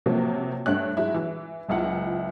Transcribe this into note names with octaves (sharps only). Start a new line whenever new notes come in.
C3 F3 F#3 A#3
G2 A3 C#5 F#6
F#3 G#3 E4
E3
F#1 C#2 E4 F4 F#5